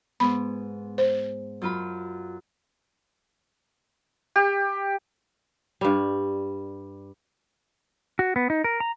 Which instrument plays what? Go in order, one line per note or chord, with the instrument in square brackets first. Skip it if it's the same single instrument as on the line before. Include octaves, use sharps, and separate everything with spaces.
[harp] G#2 B3 [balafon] B5
[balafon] C5
[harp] F#2 F4 B5
[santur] G4
[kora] G2 G3
[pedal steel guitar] F#4
B3
D#4
A#4
A#5